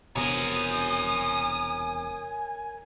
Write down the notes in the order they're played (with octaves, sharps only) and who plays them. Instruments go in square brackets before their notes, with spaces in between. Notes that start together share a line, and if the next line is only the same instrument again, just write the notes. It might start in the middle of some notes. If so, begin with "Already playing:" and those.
[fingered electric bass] E1 C3 B3 [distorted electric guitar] A#4 C#5 [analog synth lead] G#5 [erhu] D#6